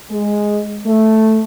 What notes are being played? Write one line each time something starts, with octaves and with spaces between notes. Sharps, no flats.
G#3
A3